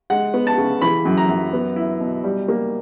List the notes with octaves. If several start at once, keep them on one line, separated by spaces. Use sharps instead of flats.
G#3 F#5
B3
A5
C#3
E3 B5
F#2
A#5
F#2
B3
E4
B2
G3
A#3